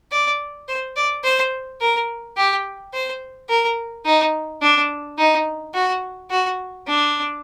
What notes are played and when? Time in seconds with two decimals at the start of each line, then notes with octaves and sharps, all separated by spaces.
0.12 D5
0.68 C5
0.96 D5
1.24 C5
1.81 A#4
2.37 G4
2.93 C5
3.50 A#4
4.06 D#4
4.62 D4
5.18 D#4
5.74 F#4
6.31 F#4
6.87 D4